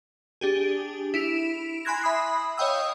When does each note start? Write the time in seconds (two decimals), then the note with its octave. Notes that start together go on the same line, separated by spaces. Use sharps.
0.41 D4 G4 G#4
1.14 E4 D7 E7 F7
1.85 G#5 B5 C6 F#6 G#6 A#6
2.02 E5 B5 D#6 C7
2.57 C#5 D#5 F5 G5 D#6 E6